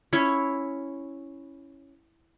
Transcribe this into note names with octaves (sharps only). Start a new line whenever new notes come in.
C#4 E4 C#5